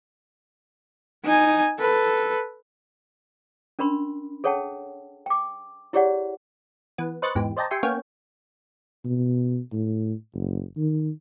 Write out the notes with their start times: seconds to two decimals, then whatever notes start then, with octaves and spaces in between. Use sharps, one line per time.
1.24 D#4 G#5
1.79 A4 B4
3.79 C#4 D4 A#4 B5 C6
4.44 G#4 A4 C#5 F#5 G5 A5
5.26 G5 D6
5.93 E4 G4 G#4 C#5 D5 F#5
6.98 E3 B3
7.22 B4 C5 D#5 C#6 F#6 A6
7.35 E2 G#2 E3 G4
7.57 C5 D5 D#5 G5 A5 A#5
7.71 G4 E5 G5 G#5 C6 C#6
7.83 A#3 B3 C#4 C#5 F5 G5
9.05 B2
9.73 A2
10.34 F#1
10.77 D#3